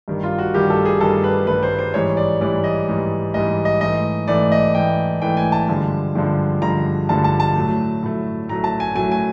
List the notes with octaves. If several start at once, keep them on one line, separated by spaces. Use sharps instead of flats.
G2 D#3 G3
F4
F#4
G2 D#3 G3 G4
A4
G#4
G2 D#3 G3 A4
B4
G2 D#3 G3 B4
C5
C5
G#2 E3 G3 C#5
D5
G#2 E3 G3 D5
D#5
G#2 E3 G3
G#2 E3 G3 D#5
D#5
G#2 E3 A3 D#5
G#2 E3 A3 D5
D#5
G#2 E3 A3 G5
G#2 E3 A3 G5
G#5
A5
G2 D3 F3 G#3
G2 D3 F3 G#3
G2 D3 F3 G#3 A#5
G2 D3 F3 G#3 A5
A5
A5
A2 F#3 A3
A2 F#3 A3
A2 F#3 A3 A#5
A5
G#5
A2 F#3 A3 G#5
G#5